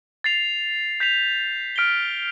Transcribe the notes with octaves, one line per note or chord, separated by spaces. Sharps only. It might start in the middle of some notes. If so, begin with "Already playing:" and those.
A6 C7 F7
G6 B6 F7
F6 B6 D7 G7